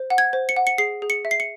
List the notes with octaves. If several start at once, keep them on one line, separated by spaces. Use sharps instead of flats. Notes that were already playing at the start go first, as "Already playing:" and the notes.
Already playing: C5
F#5
G#6
C5
C#7
F#5
C#7
G#4 C7
G#4
C#7
E5
C7
C#7